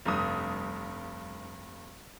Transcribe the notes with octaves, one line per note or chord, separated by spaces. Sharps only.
F1 G2 D#6